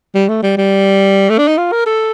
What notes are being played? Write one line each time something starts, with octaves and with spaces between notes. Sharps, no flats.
G3
A3
G3
G3
A3
D4
D#4
F4
A#4
A4